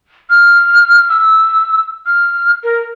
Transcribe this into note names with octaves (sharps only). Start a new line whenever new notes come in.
F6
E6
F6
A#4